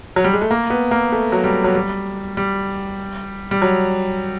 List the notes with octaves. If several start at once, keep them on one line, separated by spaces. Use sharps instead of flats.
F#3
G3
G#3
A3
A#3
B3
A#3
A3
F#3
G3
F#3
G3
G3
G3
F#3